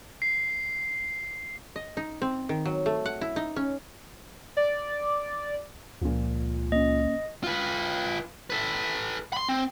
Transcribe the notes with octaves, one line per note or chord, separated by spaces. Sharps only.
C7
D#5
D#4
C4
D#3
F#3
A3
F#5
E4
D#4
C#4
D5
C#2 A#2 F3
A#3 C#4 D#5
F4 B4
A4 B4
B5 C6
C4